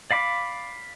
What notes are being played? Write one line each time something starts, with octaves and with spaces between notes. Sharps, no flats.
D5 F5 B5 D6